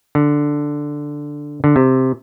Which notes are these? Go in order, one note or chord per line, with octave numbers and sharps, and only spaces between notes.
D3
D3
C3